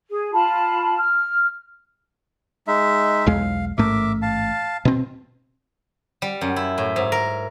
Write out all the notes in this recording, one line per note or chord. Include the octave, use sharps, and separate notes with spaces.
G#4
F4 A5 B5
F6
G#3 D#4 E5
B1 E2 G#3 F5
A1 G#2 A3 A#4 E5 D6
F5 A5
B2 C4
G3
F#2
E4
A2
G#2
A#4